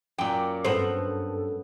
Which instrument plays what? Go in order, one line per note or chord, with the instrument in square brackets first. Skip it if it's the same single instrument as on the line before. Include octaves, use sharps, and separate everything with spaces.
[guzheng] F#2 A#2 [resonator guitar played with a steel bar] G5 [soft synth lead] D6
[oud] G2 C5 [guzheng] B3 F#5 [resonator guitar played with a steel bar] C4 [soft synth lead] A4